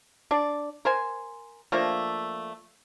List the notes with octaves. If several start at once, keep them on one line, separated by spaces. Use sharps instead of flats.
D4 D5
A#4 C5 G#5
F3 A3 A#3 D4